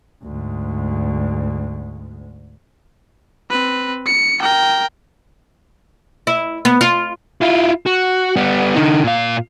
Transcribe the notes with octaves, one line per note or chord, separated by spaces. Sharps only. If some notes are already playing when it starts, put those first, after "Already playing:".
D2 G#2
C4 B4
C#7
A#4 G5
E4
B3
F4
E4 F4
F#4
G3 B3
D3 D#4
A#2 F5